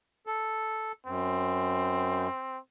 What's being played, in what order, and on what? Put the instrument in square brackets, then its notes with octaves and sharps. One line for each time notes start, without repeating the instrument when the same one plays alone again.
[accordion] A4
[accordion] F#2 [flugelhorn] C4